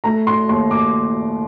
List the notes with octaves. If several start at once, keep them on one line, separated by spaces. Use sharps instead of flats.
A3 A#5
C6
D#2 C6
D6